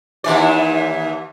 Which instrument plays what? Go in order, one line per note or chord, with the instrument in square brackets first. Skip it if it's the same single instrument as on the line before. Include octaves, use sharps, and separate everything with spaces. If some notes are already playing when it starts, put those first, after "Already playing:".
[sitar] D#2 E3 D5